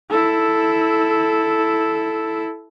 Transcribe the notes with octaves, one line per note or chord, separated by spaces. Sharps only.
E4 A4